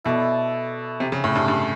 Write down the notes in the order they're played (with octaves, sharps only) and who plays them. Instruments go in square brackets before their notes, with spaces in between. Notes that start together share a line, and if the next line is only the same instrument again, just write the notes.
[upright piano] B2 [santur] E4 A4 D5
[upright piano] C3
C#3
A2
G2
G2